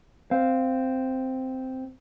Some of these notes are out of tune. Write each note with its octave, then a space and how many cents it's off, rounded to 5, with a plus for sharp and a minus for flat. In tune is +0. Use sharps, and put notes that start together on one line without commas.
C4 -5 F5 +0